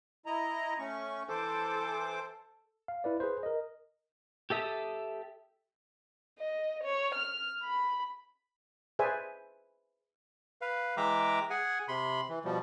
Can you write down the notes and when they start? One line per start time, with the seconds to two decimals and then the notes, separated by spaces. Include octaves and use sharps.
0.26 E4 D#5 A#5
0.79 A3 C#4 C#6
1.29 E3 A4 C5 D6
2.88 F5
3.04 E4 B4 D5
3.20 G#4 B4 C5
3.43 A#4 D#5
4.50 G4 A4 E5 D#6
6.39 D#5
6.84 C#5
7.15 F6
7.63 B5
8.99 G#4 B4 C5 D5 E5 G#5
10.61 B4 F5
10.97 E3 G#3 E5 G5 A#5 D6
11.50 G#4 F#5 G#5
11.88 C3 B5 C6
12.29 E3
12.45 B2 F3 G3